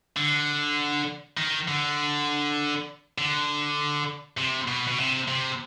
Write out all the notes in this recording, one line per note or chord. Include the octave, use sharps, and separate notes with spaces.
D3
D#3
D3
D3
C3
B2
B2
C3
C3